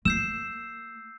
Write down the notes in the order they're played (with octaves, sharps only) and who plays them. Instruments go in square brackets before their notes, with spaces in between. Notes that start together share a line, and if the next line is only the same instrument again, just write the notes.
[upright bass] A#3 [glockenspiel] E6 G6 C7 [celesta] E7